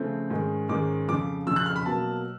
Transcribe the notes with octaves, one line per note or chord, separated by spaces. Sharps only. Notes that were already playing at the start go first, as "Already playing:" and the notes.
Already playing: C#3 F3 A3 C4
G#2 D#3 G#3 C#4
G#2 D#3 G#3 C#4 D6
F2 C#3 F3 D6
F2 C#3 F3 E6
F#6
F6
B5
B2 F#3 A#3 A5